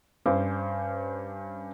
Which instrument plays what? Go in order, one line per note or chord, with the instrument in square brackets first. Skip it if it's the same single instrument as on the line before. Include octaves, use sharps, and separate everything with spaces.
[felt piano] G2 C#4 C5 D6